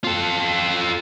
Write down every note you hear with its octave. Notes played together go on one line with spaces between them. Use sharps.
F4 A4